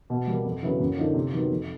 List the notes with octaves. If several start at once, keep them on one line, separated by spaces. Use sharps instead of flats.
B2
G3 A#3
F2
C#3 F#3 B3 E4
F#2
D3 F3 A#3 D#4
C3
D#3 F#3 B3
F2